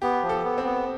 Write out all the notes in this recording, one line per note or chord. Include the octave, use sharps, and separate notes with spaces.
B3 G4
F3
A4
B3
C4
B3